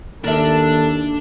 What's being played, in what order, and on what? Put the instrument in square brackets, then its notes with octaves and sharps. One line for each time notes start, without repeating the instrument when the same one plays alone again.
[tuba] D#2 [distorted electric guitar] D4 [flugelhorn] A4 [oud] A#4 E5